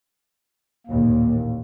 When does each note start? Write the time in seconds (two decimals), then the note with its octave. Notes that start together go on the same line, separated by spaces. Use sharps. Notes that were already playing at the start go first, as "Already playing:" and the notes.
0.87 A1 D#2 A#2 A#3